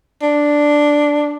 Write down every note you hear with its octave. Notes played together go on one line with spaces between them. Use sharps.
D4